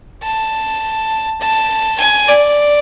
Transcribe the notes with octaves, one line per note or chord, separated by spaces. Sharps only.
A5
A5
G#5
D5